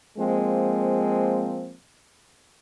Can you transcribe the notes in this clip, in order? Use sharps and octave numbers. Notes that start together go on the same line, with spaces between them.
F3 G#3 A#3 C4